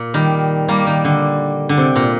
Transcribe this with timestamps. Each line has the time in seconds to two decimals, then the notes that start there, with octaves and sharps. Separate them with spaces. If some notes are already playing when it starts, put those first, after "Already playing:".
Already playing: A#2
0.14 D#3 G3
0.68 G3 A#3
0.87 D#3
1.04 D3
1.69 D3
1.78 C3
1.96 A#2